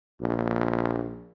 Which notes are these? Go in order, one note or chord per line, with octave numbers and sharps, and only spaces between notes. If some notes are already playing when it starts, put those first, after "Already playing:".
A#1